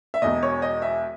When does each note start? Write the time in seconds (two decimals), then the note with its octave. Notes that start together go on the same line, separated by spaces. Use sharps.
0.14 E5
0.22 E1 E2 B2 D#5
0.43 C#5
0.62 D#5
0.82 E5